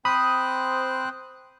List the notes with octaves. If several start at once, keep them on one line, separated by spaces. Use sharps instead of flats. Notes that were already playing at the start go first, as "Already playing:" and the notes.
C4 C5 B5 D#6 F#6